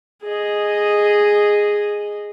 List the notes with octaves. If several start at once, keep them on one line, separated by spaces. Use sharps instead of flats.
G#4 D#5